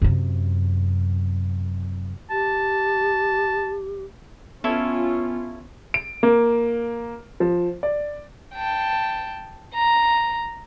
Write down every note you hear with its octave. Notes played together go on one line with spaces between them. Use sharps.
F#2 C3
G4 A5
B3 C#4 E4 F4 A4 C#5
D7
A#3
F3
D5
G5 A5
A#5